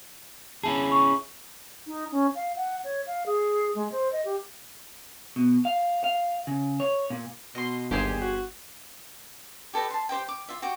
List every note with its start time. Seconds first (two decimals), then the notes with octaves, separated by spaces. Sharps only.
0.63 C#4 E4 G#4 A5
0.92 C#6
1.87 D#4
2.12 C#4
2.35 F5
2.56 F#5
2.84 C#5
3.07 F5
3.26 G#4
3.75 G#3
3.92 C5
4.12 D#5
4.25 G4
5.36 B2
5.65 F5
6.04 F5
6.47 C#3
6.80 C#5
7.10 A#2
7.55 B2 D#5 C6
7.91 G1 D#2 G4 G#4 C5
8.21 F#4
9.73 G4 A4 B4 D#5
9.91 A5 C6
10.09 G4 C5 D#5 G5
10.29 D6
10.49 F4 E5
10.62 F#4 G4 D6